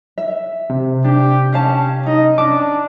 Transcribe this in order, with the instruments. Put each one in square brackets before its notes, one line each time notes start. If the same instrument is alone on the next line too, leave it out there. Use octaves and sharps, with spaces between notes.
[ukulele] E5
[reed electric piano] C3
[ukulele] D4 [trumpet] G4
[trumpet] C#4 [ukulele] G4 F5 A5
[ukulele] D#4 [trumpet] D#5
[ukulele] C#4 A5 [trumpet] D4 [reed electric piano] D6